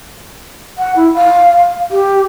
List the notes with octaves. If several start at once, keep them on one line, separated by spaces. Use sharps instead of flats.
F#5
E4
F5
G4